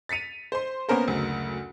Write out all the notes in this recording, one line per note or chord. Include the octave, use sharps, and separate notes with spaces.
A6 B6 C#7 D#7 F7
C5 C6
A#3 B3 C#4 A#4 C5
F#1 D2